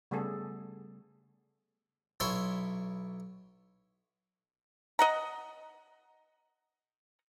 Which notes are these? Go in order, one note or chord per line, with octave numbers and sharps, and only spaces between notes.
C#3 G3 A3 B3 G#4 A4
B1 E4 C#5 E5 C6
D#5 F#5 A#5